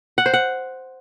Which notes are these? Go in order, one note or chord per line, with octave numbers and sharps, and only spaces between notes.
F#5
C5
F#5